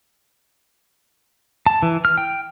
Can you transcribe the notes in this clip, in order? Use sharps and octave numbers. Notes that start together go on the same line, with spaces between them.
A5
E3
F6
G5